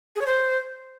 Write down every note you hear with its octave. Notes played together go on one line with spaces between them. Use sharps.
G#4
C#5
C5